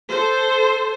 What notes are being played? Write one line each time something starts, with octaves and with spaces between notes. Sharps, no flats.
A4 C5